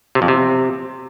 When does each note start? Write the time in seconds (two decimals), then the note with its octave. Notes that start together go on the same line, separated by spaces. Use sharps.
0.15 C3
0.22 F2
0.28 C3